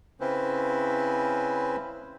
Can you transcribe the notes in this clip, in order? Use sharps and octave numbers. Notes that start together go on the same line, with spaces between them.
C#3 C4 C#4 E4 B4 C5